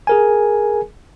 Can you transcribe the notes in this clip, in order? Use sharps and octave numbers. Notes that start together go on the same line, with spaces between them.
G#4 A#4 G#5